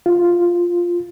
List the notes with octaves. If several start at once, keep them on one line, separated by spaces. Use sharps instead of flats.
F4